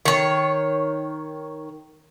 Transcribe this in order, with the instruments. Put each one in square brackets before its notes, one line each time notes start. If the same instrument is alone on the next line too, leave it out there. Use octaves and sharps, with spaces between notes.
[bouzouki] D#3 C#5